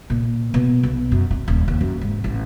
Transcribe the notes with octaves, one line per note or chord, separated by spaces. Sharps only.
A#2
B2
B1
F#2
C4
D#1
D#2
F#2
G#2
A1